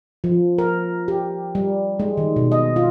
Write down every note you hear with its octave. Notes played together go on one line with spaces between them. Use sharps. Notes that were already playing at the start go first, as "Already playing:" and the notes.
F3
A#4
G4
G3
G#3
D#3
B2
D#5
F4